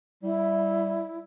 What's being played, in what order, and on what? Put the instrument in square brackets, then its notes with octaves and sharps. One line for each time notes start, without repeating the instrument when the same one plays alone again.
[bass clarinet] G3 [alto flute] E4